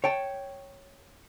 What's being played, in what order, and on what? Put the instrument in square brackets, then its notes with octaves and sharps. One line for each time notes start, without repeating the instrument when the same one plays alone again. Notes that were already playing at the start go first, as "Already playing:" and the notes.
[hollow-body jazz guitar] C#5 G5 A5